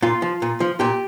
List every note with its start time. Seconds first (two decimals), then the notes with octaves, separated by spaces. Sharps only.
0.02 A#2 F4
0.22 F3
0.42 A#2
0.60 F3
0.80 A#2 G4